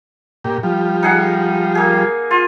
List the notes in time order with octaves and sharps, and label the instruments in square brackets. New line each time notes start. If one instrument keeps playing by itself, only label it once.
[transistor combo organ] A#2 G4
F3 G3
[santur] D#4 G#4 F#5
A#3 G#4
F4